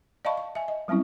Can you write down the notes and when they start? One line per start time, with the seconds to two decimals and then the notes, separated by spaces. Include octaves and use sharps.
0.25 D5 D#5 F5 A5 B5 C#6
0.37 C#6
0.55 E5 G#5
0.68 D#5
0.88 F#3 G3 C4 C#4 E4